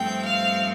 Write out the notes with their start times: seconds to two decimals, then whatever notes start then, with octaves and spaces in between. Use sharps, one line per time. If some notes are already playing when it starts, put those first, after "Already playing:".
Already playing: G2 F3 A3 C4 G5
0.25 F5